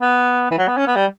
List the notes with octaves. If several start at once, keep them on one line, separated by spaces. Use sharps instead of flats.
B3
E3
F#3
B3
C#4
B3
G3